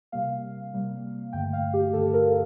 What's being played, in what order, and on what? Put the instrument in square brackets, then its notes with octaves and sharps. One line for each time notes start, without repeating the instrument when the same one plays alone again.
[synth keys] C3 G3 A#3 F5
C3 G3 A#3
G2 D3 A3 G5
F5
G4
G2 D3 A3 A4
A#4